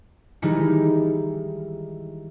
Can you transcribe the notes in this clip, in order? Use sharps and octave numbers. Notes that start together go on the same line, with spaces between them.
D#3 E3 G3 G#3 D#4 E4